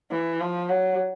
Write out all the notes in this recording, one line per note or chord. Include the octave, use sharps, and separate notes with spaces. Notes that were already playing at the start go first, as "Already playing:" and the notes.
E3
F3
F#3